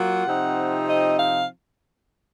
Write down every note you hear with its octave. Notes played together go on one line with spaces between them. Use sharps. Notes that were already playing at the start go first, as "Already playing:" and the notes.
Already playing: F#3 A#3 F4 F#5
C3 F3 C4 D#4
D#5
F5